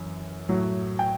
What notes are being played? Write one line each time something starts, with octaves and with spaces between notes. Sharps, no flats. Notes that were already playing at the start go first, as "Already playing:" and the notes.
Already playing: F#2 E3
A2 F#3
G5